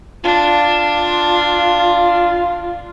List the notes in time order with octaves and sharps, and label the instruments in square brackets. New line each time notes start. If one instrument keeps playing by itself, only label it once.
[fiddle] D4 [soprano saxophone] F4